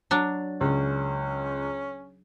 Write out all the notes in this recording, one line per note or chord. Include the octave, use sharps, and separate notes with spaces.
F#3 D4
C#2 C#4